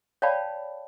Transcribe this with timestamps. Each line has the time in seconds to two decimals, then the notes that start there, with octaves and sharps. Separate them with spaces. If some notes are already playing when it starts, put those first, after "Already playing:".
0.22 C#5 D5 F5 G5 A5 B5